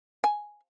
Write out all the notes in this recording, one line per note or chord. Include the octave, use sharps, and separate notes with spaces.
G#5